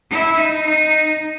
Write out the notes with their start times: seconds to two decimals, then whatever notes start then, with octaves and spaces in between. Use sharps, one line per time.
0.10 E4
0.38 D#4
0.67 D#4